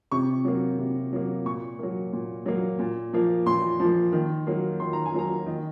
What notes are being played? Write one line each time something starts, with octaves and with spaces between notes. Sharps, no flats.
C3 C#6
F#3 A#3
C3
F#3 A#3
A#2 C#6
F#3 A#3
A#2
F#3 A#3
A#2
F3 A#3
A#2 C6
F3 A#3
D#3
F#3 A#3
D#3 C6
A#5
G#5
F#3 A#3 A#5
D#3 D#5